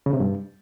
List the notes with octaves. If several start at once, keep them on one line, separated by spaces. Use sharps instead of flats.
C#3
C3
G2